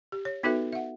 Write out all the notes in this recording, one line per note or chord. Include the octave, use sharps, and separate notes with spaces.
G4
C#5
B3 D#4 F#4 A4 B4 E5
E5 F#5